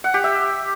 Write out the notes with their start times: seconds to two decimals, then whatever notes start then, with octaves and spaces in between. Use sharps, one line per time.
0.04 F#5
0.14 G4
0.24 E5